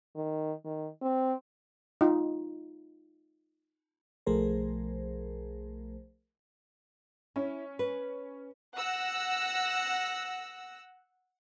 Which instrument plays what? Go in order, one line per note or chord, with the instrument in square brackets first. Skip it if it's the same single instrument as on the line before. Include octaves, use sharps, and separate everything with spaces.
[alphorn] D#3
D#3
C4
[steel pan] D#4 F4
[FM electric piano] B1 F3 A3 G#4 A#4 C5
[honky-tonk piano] C#4 [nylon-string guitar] E4
[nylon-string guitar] B4
[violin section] F#5 E6 A#6